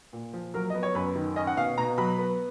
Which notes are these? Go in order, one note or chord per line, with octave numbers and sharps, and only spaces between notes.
A#2
F3
F#3 A#4
B3 D#5
C#5
F#2 B4
D#3
C#4 D#5
F#5
B2 F5
B2 A#5
F#3 B5
B3